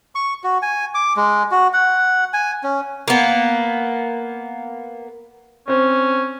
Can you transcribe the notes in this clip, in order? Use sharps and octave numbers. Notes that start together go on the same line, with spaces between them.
C#6
F#4
G#5
D6
G#3
F#4
F#5
G#5
C#4
A#3 B3
C4 C#4 C5